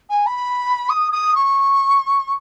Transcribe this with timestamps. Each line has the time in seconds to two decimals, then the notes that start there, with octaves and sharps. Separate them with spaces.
0.10 G#5
0.26 B5
0.89 D#6
1.12 D#6
1.35 C#6